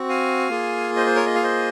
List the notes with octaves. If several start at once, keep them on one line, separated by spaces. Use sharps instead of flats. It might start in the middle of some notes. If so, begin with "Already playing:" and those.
Already playing: C4 F#4
F5 G#5
A#3 F4 G#4
C5 D#5
C5
A#4 C#5
D#5
F5
C5 D#5